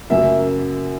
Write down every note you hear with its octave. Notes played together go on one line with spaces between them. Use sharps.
F#2 C#3 F#3 A#3 E5